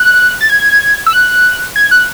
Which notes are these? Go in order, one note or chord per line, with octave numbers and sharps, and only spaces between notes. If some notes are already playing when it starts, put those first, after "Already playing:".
Already playing: F#6
A6
G#6
E6
F#6
G#6
F#6